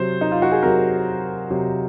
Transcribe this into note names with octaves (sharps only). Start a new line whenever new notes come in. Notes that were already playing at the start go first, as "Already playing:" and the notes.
Already playing: C3 F#3 C5
D#4
F4
F#4
G#4
C3 F#3 A#4
C3 F#3